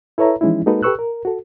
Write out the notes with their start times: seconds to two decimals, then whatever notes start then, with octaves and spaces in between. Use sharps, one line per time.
0.18 E4 A4 B4 C#5 E5 A#5
0.41 E3 F3 G#3 C#4 D#4 E4
0.66 G#3 A#3 D#4 F#4 A4 B4
0.83 G4 A4 B4 C#6 E6 F#6
0.99 A#4
1.25 F#4 A4